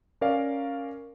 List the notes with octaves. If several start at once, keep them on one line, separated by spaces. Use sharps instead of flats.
C#4 A#4 D5 F5